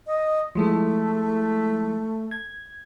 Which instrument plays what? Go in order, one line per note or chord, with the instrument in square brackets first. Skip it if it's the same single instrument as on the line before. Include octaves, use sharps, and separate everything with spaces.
[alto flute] D#5
[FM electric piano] F3 G#3 E4 [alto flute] A3
[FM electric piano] G#6